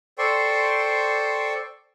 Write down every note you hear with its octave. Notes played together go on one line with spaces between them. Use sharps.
A4 C5 D5 G5 C6 C#6